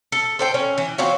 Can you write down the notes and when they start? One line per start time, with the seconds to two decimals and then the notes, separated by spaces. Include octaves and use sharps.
0.12 A4
0.39 A4 C5 G5
0.54 C#4
0.78 E3
0.98 C4 F4 F#4 C#5